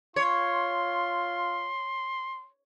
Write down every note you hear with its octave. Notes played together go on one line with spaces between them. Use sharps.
F4 C#5 C6